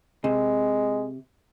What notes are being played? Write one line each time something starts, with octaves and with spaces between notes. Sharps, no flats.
C3 G#3